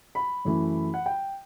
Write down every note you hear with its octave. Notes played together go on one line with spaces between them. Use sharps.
B5
F#2 E3 A3
F#5
G5